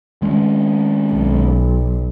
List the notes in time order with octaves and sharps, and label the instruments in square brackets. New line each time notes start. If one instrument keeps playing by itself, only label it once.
[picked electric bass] D#3 G#3 C#4
[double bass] B1